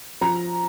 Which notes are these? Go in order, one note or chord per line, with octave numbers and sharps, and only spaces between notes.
F3 A#5